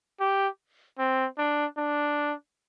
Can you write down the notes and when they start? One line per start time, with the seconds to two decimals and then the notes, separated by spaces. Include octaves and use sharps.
0.20 G4
0.99 C4
1.38 D4
1.78 D4